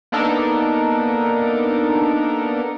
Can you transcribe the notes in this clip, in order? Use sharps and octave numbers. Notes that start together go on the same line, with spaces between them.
A#3 B3 D4 D#4 A4 A#4